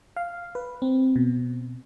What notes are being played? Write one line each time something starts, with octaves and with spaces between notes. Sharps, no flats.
F5
B4
C4
B2